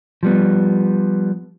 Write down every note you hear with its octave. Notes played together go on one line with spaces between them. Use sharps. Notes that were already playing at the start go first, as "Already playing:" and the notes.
F3 G3 B3